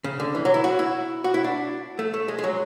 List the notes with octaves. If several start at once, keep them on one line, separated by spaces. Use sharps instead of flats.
C#3
D3
E3
F#3
E4
F#4
E4
F#4
E4
D4
A3
A3
G#3
G#3
F#3